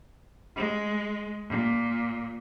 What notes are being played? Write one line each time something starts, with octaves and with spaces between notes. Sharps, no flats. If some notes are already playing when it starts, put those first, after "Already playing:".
G#3
A#2